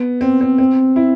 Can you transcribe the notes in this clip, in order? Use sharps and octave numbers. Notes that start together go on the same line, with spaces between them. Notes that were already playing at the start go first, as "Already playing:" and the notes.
Already playing: B3
C4
C4
C4
E4